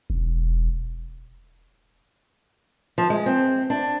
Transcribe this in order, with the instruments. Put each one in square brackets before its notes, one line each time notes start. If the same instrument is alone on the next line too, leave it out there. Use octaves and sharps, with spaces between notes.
[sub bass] E1
[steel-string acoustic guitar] F3
G#3
C4
D4